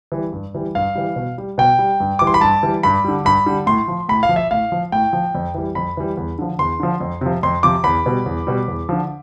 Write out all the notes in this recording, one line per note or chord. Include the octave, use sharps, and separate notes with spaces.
E3 G3
G2
E3 G3
G2 F5
E3 G3
B2
G3
B2 G5
G3
G2
E3 G3 D6
C6
B5
G2 A5
E3 G3
G2 B5
D3 G3
G2 B5
D3 G3
A2 C6
F3
A2 B5
F5
F3
E5
A2 F5
F3
A2 G5
F3
F2
E3 G3
F2 B5
E3 G3
E2
D3 F3
E2 C6
D3 F3
F2
C3 F3
F2 C6
C3 F3 D6
E2 B5
B2 G3
E2
B2 G3
E2
D3 F3